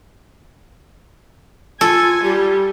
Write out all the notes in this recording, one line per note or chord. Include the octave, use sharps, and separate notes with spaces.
F4 A4 G#5
G3 G4